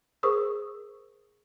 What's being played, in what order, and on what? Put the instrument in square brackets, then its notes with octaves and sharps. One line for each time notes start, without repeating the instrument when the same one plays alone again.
[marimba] G#4 A#4 C5 C#6 D#6 E6